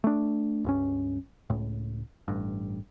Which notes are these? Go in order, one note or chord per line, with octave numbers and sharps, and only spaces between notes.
A3 D4
C#2 G2 C#4
C#2 A2
A1 G2